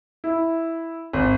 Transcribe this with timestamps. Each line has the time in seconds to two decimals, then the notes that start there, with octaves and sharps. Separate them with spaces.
0.24 E4
1.13 G#1